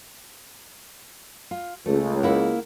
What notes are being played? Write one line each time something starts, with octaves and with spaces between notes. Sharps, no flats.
F4
C#2 A3
A#3 E4 F#5